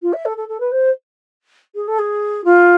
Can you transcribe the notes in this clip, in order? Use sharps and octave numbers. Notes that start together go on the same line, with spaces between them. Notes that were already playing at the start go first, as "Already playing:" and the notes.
F4
E5
A4
A4
A4
B4
C5
G#4
A4
G#4
F4